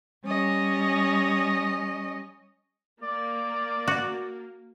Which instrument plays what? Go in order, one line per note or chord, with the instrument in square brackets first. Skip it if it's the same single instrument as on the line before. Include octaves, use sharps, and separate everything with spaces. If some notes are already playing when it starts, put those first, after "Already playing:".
[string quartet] G3 C#4 D#5
[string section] A#3 [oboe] D5
[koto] F#4